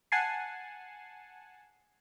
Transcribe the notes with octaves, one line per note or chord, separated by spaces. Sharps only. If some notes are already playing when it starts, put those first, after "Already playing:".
F#5 G#5 A5 C7